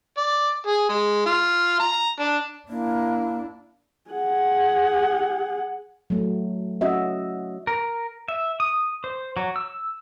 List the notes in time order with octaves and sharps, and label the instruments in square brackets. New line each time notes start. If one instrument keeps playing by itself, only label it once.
[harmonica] D5
G#4
G#3
F4
A#5
D4
[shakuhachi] A#3 [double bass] D4 E4
[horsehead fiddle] G#4 F#5
[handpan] F#3 A3
C#4 F#4 D#5 E5
[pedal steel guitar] A#4
E5
D#6
C5
F#3
E6